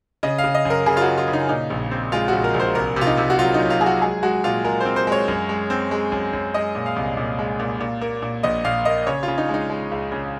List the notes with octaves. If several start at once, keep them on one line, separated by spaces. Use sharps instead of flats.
C#3 D#5
F5
C#3
D#5
F#2
A#4
C#3 G#4
F4
F#4
C#3
F4
C#3
D#4
A#2 D#4
A#1
C4
G#3 F4
F#4
A#1
A#4
A#1
C5
C2 A#4
C3 F4
D#4
C3
F#4
F#3 F4
D#4
F#3
F4
F#3 G#4
F#4
G#3 G#4
G#3 F#4
A#2 F4
G#3 A#4
C4 C5
C5
G#3 C#5
F#2
G#3
C4
G#3
F#2
F#2
G#3 D#5
A#2
F5
C2
A#2
G#3
A#2
A#2
A#3
A#2
A#1 D#5
A#2 F5
A#3 D#5
C#3 C#5
F4
C#3
D#4
G#3
D#4
G#3
C#2
C#3